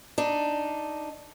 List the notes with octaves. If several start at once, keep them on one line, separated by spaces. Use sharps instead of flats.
D4 D#4